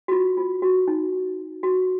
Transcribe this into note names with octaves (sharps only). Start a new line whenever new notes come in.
F#4
F4
F4
F#4
D#4
F#4